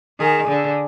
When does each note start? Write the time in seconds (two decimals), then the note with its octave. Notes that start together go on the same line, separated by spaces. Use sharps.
0.19 D#3 G#4
0.48 D3